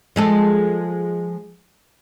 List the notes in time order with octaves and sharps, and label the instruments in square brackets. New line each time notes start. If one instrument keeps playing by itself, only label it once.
[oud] F3 G#3 A4